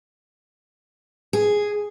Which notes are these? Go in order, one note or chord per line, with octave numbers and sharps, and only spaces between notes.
G#4